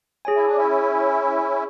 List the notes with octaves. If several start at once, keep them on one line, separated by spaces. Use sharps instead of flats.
G#4 C#5 G#5
E4
D4
C#4 E4